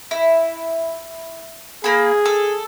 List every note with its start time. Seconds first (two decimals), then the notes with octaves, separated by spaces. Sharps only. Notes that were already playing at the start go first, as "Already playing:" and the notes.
0.11 E4
1.84 A#3 G#4 B5
2.25 A4